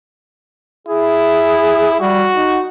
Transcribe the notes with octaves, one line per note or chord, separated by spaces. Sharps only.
E4 G#4
G3 F#4
D#4